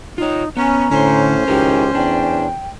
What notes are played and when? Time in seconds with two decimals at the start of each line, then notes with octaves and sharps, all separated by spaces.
0.18 D#4 F4 C#5
0.57 B3 C#4 A#5
0.92 A2 D3 C#4 C5
1.48 C#2 D#4 E4 G4 A#4
1.95 E2 D4 G5